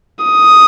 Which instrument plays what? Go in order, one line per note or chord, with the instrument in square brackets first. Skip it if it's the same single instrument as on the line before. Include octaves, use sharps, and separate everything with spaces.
[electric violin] D#6